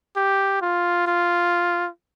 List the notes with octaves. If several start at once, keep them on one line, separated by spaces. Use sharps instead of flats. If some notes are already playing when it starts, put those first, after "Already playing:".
G4
F4
F4